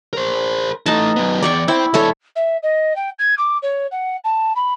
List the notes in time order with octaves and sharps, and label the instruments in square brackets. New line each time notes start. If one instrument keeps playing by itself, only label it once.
[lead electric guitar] A#4 C5
[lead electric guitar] E3 A3 [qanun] D#4 A5
[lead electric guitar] F#2 B3
[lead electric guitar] E2 [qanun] D5 G5 C#6
[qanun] E4 [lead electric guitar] C5 G5
[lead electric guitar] E2 G#3 [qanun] A4 C#5 E5
[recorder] E5
D#5
G5
G#6
D6
C#5
F#5
A5
B5